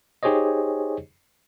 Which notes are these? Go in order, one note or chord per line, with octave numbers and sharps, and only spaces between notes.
D#4 G4 G#4 C5 C#5 D#5